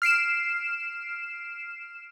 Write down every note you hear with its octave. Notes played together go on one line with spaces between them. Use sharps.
F6 C7 D7 E7